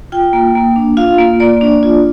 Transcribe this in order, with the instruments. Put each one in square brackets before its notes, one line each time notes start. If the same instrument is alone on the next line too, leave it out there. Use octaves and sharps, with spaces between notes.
[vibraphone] F4 G5
A#3
A#3
D4
F4 F5
A#3
A#3 D5
D4
F4